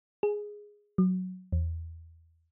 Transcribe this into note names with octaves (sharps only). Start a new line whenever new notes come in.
G#4
F#3
E2